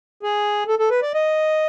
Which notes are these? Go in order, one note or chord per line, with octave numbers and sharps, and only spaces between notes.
G#4
A4
A4
B4
D5
D#5